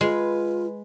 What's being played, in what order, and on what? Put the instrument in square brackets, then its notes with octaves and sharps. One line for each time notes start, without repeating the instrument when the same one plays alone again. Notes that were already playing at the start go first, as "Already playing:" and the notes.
[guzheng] G#3 [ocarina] F4 [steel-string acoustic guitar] B4